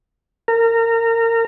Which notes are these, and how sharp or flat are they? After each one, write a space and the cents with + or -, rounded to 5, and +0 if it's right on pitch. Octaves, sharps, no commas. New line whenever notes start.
A#4 -25